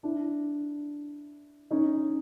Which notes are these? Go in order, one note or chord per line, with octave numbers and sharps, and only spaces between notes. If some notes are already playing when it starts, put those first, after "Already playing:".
D4 E4
C#4 D#4